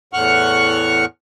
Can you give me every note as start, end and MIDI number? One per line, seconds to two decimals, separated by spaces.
0.13 1.05 40
0.13 1.05 45
0.13 1.05 78
0.13 1.05 85
0.13 1.05 89
0.13 1.05 90